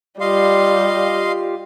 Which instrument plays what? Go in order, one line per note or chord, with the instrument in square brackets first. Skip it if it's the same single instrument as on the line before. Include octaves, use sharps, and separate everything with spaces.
[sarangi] G3 [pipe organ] F4 G4 [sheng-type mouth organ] D#5 F5 C6